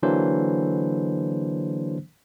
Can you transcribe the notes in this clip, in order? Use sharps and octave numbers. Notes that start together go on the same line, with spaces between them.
D3 E3 F#3 A#3 D4 C5